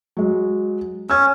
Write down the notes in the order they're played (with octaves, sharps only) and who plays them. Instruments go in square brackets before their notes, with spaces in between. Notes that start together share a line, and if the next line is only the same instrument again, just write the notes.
[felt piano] F#3 G#3
[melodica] C#4 [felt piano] E6 G#6